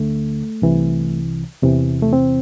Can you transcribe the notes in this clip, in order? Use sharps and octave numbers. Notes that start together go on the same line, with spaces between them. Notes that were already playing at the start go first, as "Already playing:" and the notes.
Already playing: D2 D3 A3
C2 C3 E3
E2 C3 E3
A3
C4